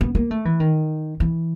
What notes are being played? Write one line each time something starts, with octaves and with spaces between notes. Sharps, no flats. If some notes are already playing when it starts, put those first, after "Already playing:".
B3
A#3
A3
E3
D#3
E3